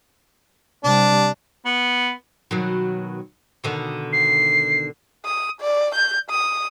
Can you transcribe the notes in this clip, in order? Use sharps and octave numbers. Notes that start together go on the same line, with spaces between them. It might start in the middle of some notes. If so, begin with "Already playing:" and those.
C3 G3 D4
B3
B2 D#3 F#3
B2 D3 D#3
C7
D#6
D5
G6
D#6